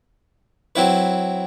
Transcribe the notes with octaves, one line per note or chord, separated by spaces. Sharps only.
F#3 C4 E4 B4